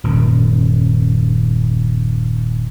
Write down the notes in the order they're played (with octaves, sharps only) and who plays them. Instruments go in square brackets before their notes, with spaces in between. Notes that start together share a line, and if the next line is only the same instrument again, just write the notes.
[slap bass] D#1 F#2